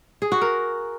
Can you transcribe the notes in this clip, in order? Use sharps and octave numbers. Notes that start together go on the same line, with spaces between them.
G#4
F#4
A#4